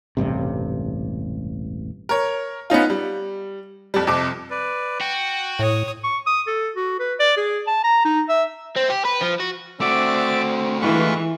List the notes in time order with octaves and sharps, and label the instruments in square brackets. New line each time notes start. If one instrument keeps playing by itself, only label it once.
[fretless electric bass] E1 A1 G2 C3
[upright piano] A#4 C#5
B3 C#4 D#4 F4
G3
F2 G3
F2 C3 D6
[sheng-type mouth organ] B4 D5
[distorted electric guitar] F#4 [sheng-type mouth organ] G5
[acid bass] A2 [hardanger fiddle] C#5 D#6
[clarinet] C#6
D#6
A4
F#4
B4
D5
G#4
A5
A#5
D#4
E5
[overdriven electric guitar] C4
G4
B4
F3
F#4
[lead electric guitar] A3 F#4 [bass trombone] C4 [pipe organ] D5 E5 D6
[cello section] E3 [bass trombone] G#3 [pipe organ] F4 B4 C#6